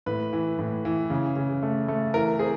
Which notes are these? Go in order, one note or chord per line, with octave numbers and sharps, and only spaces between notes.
A2 B4
E3
A2
E3
C#3
C#3
A3
A3
E3 A#4
C4 G#4